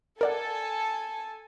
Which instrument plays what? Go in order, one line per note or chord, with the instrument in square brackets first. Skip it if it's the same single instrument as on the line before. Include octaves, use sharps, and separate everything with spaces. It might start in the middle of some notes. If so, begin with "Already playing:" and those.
[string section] A4 G#5 [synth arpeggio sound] A#4 D5 F#5